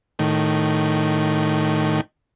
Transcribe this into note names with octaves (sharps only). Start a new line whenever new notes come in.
A2 D#3